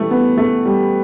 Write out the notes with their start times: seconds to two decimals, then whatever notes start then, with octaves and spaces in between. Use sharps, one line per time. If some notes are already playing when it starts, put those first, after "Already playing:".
Already playing: E3 G3 A3
0.11 B3
0.37 A3
0.66 G3